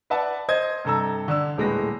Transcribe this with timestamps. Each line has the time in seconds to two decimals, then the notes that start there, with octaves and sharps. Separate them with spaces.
0.10 B4 D5 E5 F#5 A5
0.49 C5 D#5 G#6
0.85 G2 C3 A4 A#5 E6
1.28 D3 D4 E6
1.57 D#1 A2 G#3 B4 A#6